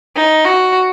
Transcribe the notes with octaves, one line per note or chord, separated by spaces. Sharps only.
D#4
F#4